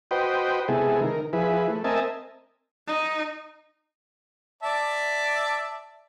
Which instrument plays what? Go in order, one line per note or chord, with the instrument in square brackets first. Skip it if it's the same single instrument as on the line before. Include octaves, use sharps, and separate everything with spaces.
[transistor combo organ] F#4 B4 C5 D#5 G5
C3 G#3 B3 E4 G#4 A4
D#3 A#4
F3 E4 G#4 B4
A3
C4 A#4 D#5 E5 G#5 A5
[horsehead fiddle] D#4
[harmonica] D5 E5 A5